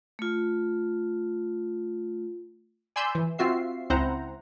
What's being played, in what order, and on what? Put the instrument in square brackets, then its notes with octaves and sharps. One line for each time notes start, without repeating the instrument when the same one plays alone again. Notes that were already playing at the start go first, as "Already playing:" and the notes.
[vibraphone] A3 F4
[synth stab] D5 G#5 B5 C6 E6 G6
E3
C4 F4 F#4 E5 C7
C#2 C4 E4 C5 F#5 A#5